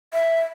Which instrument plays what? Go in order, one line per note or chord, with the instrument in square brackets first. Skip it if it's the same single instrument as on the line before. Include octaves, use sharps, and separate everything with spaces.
[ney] E5